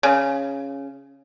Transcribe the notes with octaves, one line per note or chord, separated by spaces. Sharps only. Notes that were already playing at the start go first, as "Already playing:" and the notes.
C#3